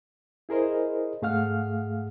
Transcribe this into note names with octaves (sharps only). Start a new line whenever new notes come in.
E4 G#4 A#4 C5 D#5
G#2 A3 G#4 F5 F#5 F6